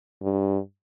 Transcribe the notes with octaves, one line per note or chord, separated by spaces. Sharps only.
G2